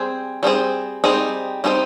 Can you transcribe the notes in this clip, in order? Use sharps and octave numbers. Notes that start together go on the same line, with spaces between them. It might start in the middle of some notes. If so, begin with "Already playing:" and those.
Already playing: G3 C4 G#4 C5
G3 C4 D#4 G#4 C5
G3 C4 D#4 G#4 C5
G3 C4 D#4 G#4 C5